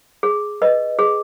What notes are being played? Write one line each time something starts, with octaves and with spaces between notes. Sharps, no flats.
G#4
B4 D#5
G#4